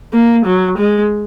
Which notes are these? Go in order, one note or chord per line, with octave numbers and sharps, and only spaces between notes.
A#3
F#3
G#3